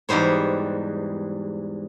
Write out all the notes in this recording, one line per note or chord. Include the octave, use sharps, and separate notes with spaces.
E2 G#2 G3 C5 C#5